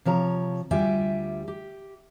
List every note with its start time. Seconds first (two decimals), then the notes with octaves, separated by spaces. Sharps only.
0.05 C3 F3 C#5 A#5
0.71 D2 G3 F4 G4 E5 G#5
1.48 G4